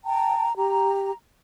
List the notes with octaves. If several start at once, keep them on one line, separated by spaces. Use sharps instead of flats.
G5 A5 A#5
G4 A#5